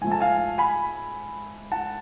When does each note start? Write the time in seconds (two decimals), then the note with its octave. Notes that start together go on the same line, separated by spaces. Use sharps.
0.01 G#2 F3 A3 G#5
0.12 A5
0.20 F5 G#5
0.58 G#5 B5
1.72 F#5 A5